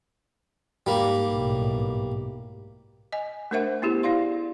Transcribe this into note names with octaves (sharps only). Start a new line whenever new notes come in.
G#2 G3 A#3
B1 A2
D#5 G#5
A3 D4 A#4 C5 E5 F#5
B3 E4 G4 G#4
E4 D5 F5 C6